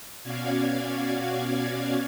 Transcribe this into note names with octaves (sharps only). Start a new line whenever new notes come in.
B2 C#4 F#4 D5 F5 G#6